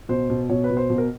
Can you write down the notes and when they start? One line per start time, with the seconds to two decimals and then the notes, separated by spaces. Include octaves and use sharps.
0.09 B2 C5
0.30 B2
0.50 B2 C#5
0.64 B4
0.70 B2
0.77 C5
0.90 B2
0.98 A#4